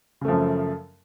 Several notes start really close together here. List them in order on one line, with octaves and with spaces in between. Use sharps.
C#3 A3 F3 F#2